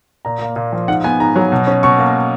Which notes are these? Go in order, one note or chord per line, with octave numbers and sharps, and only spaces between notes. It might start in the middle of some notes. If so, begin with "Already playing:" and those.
A#2 A#5
A#3
A#2
F3
G#2 F#5
B3 G#5
G#2 A#5
F#3
B2
C#4
B2 C#6
A#3